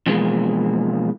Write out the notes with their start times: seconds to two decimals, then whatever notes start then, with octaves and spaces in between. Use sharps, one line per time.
0.06 B2 E3 F3 G#3 A#3